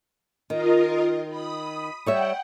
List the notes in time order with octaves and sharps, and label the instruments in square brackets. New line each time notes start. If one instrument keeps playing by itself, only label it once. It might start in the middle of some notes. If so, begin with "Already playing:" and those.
[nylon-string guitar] D#3 [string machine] F4 A#4 D#5
[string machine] B5 D#6
[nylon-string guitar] G3 C#5 E5 [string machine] F#5 G5